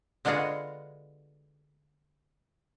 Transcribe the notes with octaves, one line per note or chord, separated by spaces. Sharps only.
D3 G#3 B3 F4 F#4 G#4